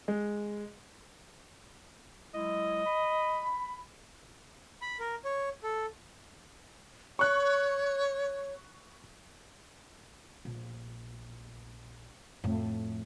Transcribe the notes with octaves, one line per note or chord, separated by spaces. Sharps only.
G#3
F#3 G#3 E4 D#5
B5
B5
A#4
C#5
A4
C#5 C#6 F#6
A#1
F2 A2